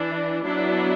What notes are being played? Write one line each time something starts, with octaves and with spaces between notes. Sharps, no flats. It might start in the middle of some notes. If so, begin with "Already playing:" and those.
Already playing: E3 D4
F#3 B3 D4 E4